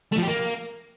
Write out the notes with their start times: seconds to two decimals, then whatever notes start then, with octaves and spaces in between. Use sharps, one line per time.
0.12 A3
0.18 F3
0.23 G4
0.28 A#3